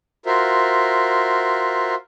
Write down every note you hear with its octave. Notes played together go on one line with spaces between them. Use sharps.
F4 F#4 A#4 C5 E5